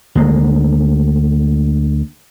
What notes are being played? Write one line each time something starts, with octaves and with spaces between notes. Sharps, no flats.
D2 G#3 A#3